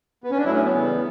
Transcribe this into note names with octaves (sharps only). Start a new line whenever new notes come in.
B3
C#4
D4
A2 F#3 E4
C#4
B3
C#3 E3 G3